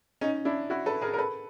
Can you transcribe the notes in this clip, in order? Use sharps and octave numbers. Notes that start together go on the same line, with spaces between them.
C#4 D#4
D4 E4
E4 F#4
A4 B4
G#4 A#4
A#4
A4 B4